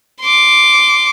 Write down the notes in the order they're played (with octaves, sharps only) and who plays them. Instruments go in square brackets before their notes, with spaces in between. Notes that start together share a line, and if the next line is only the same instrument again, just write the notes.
[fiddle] C6 D6